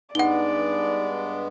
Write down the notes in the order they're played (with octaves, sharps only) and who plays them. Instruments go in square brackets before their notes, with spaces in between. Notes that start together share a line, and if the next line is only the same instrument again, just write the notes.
[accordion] G2 G#3 B3 [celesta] D#4 [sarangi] D5 [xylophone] F#5 G7